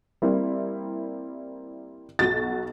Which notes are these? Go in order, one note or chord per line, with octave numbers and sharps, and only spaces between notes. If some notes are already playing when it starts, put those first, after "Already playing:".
G3 A#3 C4 E4
B1 F#4 A6